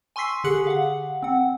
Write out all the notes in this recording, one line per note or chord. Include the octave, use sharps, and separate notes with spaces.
G#5 C6 C#6 E6 B6 C7
D3 G4 G#4 F#6 C#7 F#7
F5 F#5
C4 F#5